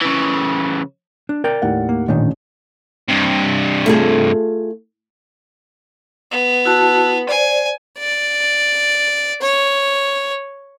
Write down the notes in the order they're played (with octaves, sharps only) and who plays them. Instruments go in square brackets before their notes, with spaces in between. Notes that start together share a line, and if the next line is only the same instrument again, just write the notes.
[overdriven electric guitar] C#3 E3
[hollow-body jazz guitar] D4
A#4 D5 G5
[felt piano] D#2 A2 F#5
[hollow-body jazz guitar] A#3
[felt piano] A1 C#4 D4 [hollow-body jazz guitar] A#2 D#3
[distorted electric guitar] G2 C3
[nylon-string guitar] A3 F4 G#4
[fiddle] B3
[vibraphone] E4 F#4 A5
[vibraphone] C5 D5 [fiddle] G#5
[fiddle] D5
C#5